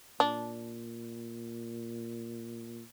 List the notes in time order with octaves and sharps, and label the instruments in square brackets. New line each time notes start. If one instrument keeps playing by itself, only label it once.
[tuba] A#2 [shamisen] D4